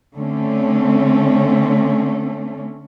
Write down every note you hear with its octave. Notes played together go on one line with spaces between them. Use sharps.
D3 A3 C4 C#4